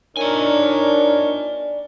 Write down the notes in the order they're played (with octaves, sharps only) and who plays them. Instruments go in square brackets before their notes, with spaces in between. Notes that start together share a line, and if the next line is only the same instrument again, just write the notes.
[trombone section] D4 D#4 [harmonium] A#4 C#5 [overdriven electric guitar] D5 G#5